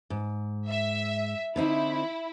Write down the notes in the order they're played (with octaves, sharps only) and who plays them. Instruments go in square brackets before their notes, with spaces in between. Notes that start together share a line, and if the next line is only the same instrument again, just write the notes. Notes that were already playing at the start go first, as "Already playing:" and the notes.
[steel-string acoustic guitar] G#2
[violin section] E5
[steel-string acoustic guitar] D3 C4 D#4 [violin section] E4